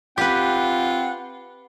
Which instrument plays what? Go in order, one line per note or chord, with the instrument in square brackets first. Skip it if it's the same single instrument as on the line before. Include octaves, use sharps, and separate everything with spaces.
[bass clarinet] C4 [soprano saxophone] F4 [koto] G4 B4 [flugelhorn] F#5